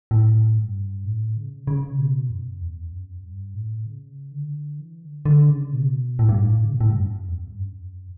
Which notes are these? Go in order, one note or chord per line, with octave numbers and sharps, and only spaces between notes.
A2
G2
A2
C#3
C#3
B2
F#2
E2
F#2
G2
A2
C#3
D3
E3
D3
D3
C#3
B2
A2
G2
A2
C#3
B2
A2
G2
F#2
E2
G2
F#2